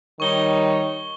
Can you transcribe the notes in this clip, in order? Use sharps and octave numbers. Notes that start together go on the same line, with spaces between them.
D#3 G3 D#4 C#5 C#6 G7